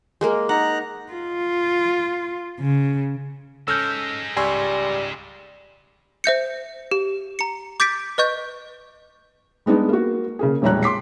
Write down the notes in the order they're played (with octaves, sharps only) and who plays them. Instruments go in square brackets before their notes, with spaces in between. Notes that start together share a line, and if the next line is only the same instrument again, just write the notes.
[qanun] G#3 A#3 A#4
[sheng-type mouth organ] D#4 A#5 F#6 [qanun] F#5
[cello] F4
C#3
[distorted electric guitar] G#3 D#4 [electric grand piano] C#4 A4 [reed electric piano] E6 F6 G6
[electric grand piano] C#2 C#6 E6 [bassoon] G3 [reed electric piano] G#5 C6
[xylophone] C5 E5 G6 C#7
G4
A#5 C#7
D6 G6 A6 B6 D7
B4 D#5 C#6 G6
[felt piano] G3 G#3 B3 D4 D#4
A#3 F#4
C#3 A#3 G#4
E1 A#1 G3 C#5 A#5 F#6
C6 D6 B6 C7